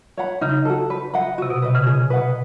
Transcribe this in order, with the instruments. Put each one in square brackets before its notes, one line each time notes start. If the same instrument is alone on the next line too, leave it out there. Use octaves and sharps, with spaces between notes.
[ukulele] C#5 F#5 B5
[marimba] C#3 [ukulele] D#4
[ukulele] F#4 A4
B4
D#5 F#5 B5
[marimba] C3 [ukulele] F#4
[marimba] B2
[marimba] C3 [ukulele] B4 D#5
[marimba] C#3
[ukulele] G#4
B4 D#5 F#5